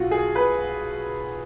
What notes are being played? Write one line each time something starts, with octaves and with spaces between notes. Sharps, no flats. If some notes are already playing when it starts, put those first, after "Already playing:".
Already playing: B1 B2 F4 F#4
G#4
B4